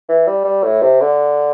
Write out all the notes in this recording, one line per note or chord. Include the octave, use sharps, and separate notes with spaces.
E3
G3
G3
A2
C3
D3